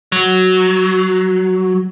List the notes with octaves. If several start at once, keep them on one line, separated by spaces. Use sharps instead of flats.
F#3